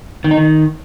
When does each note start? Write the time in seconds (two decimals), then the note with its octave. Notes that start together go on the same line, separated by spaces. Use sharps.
0.24 D#3
0.31 D#4
0.37 D#3